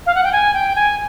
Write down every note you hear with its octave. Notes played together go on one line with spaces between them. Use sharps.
F5
F#5
G5
G#5
G5
G#5